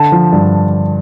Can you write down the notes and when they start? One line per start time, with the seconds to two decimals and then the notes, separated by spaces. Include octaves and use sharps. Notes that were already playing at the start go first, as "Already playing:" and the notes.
Already playing: D3 A5
0.12 F3
0.33 G2